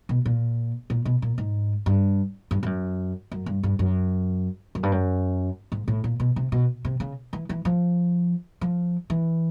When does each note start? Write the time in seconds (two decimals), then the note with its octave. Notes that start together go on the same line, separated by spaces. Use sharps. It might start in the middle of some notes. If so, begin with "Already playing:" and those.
0.09 B2
0.25 A#2
0.90 A#2
1.05 B2
1.22 A#2
1.38 G#2
1.86 G2
2.51 G2
2.63 G2
2.66 F#2
3.31 F#2
3.46 G2
3.63 G2
3.79 F#2
4.75 F#2
4.83 G2
4.92 F#2
5.72 G#2
5.88 A2
6.04 A#2
6.20 B2
6.36 C3
6.52 B2
6.85 C3
7.00 C#3
7.33 E3
7.49 E3
7.65 F3
8.61 F3
9.10 E3